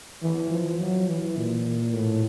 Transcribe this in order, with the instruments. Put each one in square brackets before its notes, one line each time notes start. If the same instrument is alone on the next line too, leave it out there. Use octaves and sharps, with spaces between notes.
[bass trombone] E3
F3
F#3
E3
A#2
A2